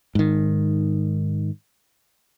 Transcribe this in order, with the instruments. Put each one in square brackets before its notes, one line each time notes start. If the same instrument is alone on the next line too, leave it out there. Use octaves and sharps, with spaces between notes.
[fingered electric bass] G#2 D#3